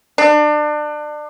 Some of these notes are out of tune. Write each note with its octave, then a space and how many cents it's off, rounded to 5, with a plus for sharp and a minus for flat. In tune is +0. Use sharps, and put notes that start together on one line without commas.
D4 +30